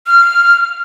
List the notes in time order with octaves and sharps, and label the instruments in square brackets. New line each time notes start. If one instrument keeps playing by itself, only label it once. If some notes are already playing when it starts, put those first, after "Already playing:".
[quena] F6